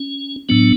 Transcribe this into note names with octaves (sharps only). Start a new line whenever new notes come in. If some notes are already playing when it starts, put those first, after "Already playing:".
Already playing: C#4
A2 F#3 B3 D4